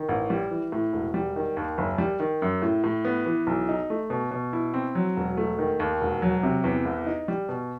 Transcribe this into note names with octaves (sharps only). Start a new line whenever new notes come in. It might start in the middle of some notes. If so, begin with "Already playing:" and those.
Already playing: D#3
A1
G3
E3
A2
E1
G3
D#3
D#2
F#1
G3
D#3
F#2
A2
A2
B3
E3
B1
D#4
A3
B2
B2
E4
C4
F#3
E1
A3
D#3
D#2
E1
F#3
C3
E2
C2
D#4
G3
B2